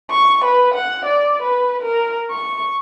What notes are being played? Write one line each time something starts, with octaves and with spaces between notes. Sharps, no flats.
C#6
B4
F#5
D5
B4
A#4
C#6